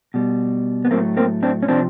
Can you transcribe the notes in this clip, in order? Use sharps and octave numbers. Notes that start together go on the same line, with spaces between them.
B2 G3
B3
A2 F#3 A3 A#3 C4
A#3 C4
C4 D4
C#4
C3 F3 C4 D4